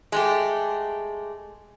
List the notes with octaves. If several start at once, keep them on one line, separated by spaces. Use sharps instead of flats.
G#3 A3 G4